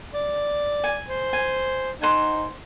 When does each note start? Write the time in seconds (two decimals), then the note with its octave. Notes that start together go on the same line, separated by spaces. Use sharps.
0.14 D5
0.84 G#5
1.09 C5
1.33 G#5
2.02 D#4 C5 F#5 G#5